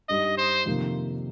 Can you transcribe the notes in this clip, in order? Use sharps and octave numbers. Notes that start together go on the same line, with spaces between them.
G2 G3 D#4 G4 D#5
C5
F2 C3 D#3 A#3